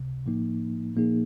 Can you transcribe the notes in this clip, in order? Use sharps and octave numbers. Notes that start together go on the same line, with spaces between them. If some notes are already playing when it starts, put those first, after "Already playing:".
Already playing: C#2 C3
A2 F3 A#3 D#4
A#2 F3 A#3 D#4 G#4